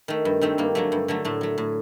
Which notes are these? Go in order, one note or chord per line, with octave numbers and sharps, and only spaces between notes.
D#3 A3
G2
D#3 A3 C4
G2 A#3
D3 F#3 A3
G2
D3 F#3 A3
A2 A3
F#3 A3
A2